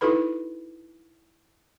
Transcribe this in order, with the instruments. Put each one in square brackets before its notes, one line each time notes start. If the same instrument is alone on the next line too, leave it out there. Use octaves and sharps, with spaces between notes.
[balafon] D#4 E4 F#4 A4 B4 B5